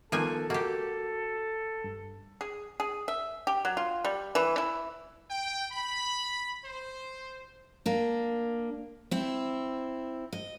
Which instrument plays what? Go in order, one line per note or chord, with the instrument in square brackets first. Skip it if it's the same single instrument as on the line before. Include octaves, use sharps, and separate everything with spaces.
[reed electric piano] D#3 B3 F#6 [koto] F3 A#3 G#5 [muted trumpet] A4
[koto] A#3 G4 [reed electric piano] F#4
[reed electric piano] G2
[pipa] G#4
G#4
E5
G4
F#3
F4
G3
E3
E4
[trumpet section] G5
B5
C5
[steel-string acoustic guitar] A#3 D4
C4 E4
D#5